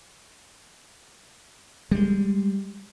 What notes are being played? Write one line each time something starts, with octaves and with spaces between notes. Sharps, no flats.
G3 G#3